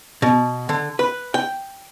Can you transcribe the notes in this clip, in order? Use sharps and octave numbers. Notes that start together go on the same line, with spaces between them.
B2
D3
B4
G5